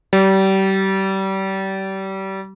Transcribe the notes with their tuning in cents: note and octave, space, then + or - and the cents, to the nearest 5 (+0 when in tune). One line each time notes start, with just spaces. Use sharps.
G3 -30